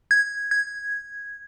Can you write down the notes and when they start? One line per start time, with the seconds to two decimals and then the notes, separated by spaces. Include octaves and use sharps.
0.11 G#6
0.51 G#6